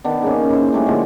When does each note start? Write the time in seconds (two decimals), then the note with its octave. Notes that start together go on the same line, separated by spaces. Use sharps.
0.04 D#3 B3 D4
0.22 C#3 A#3 C#4
0.50 D#4 E4 C5
0.73 G3 A3 C#4 D4
0.86 A#2 D3 F3 G#3